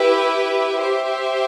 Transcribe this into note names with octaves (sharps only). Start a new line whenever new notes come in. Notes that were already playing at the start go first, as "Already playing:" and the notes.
Already playing: E4 G4 B4 E5
G4 C5 E5